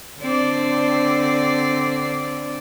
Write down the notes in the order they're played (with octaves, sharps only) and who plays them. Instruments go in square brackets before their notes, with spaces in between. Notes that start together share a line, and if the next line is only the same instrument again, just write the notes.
[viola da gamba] D3 C4 D5